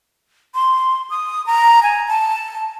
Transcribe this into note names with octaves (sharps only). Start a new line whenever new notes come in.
C6
D#6
A#5
G#5
A5